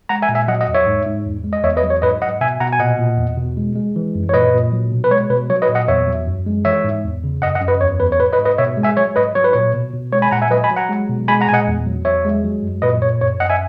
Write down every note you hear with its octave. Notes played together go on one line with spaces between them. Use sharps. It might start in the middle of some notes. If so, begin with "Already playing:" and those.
G#3 F#5 A#5
E5 G#5
A#2
E5 G#5
F#3 D#5 F#5
D#5 F#5
E2
C#5 E5
G#2
G#2
E2
G#3
D#5
E2 C#5 E5
B4 D#5
F#3
C#5
G#2 B4 D#5
G#2 D#5 F#5
B2 E5 G#5
B2 F#5 A#5
G#5
A#2 D#5 F#5
A#2
E2
B2
G#3
G#3
E3
F#2
C#5
A#2 B4 D#5
A#2
F#3
B2
B4
G#3 C#5
B2 B4
F#3 C#5
B4 D#5
A#2
D#5 F#5
E2 C#5 E5
F#3
F#2
G#3
E3 C#5 E5
G#2
E2
C#3
F#2 D#5 F#5
D#5 F#5
F#2
B4 D#5
E2 C#5
E2 B4
C#5
G#2 B4
B4 D#5
G#2
B4 D#5
B2 C#5 E5
G#3
E5 G#5
F#3 C#5
G#2 B4 D#5
F#3 C#5
B4
A#2 C#5
B2
B2
G#3 C#5
G#5 B5
A#2 F#5 A#5
E5 G#5
F#3 B4 D#5
G#5 B5
F#3
F#5 A#5
G#3
B2
G#3 G#5 B5
F#5 A#5
A#2 G#5
D#5 F#5
E2
F#3
E2 C#5 E5
G#3
F#3
F#2
A#2 B4 D#5
A#2 C#5
F#2 C#5
F#2 D#5 F#5
E5 G#5